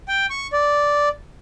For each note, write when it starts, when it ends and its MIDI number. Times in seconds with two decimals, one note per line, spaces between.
0.08 0.26 79
0.30 0.47 85
0.53 1.09 74